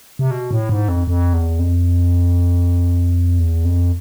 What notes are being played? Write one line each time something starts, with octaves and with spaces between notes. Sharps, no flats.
C3
B2
A2
G#2
F2
F2
E2
F2
E2
F2